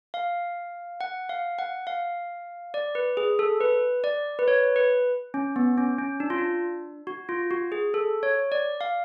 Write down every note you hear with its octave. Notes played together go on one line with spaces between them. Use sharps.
F5
F#5
F5
F#5
F5
D5
B4
G#4
A4
B4
D5
B4
C#5
B4
C#4
B3
C#4
C#4
D4
F4
D4
F#4
F4
F#4
G#4
A4
C#5
D5
F5